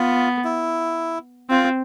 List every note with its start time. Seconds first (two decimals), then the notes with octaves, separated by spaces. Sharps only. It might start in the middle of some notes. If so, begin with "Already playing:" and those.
Already playing: B3 F4
0.44 E4
1.50 C4 F4